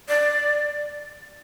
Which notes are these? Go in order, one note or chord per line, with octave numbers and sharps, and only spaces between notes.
D5